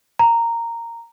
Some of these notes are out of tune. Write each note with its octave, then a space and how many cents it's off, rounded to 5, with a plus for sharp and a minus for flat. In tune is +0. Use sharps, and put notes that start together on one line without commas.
A#5 -10